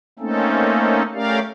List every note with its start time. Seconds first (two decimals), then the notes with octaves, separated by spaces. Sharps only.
0.19 A3 A#3 C4 C#4 D#4 A4
1.14 A3 C#4 G4 A#4 D5 F5